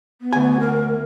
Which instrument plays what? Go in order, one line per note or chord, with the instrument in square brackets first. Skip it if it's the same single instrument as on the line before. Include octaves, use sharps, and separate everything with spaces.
[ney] B3
[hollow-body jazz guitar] D2 G#5
[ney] A#4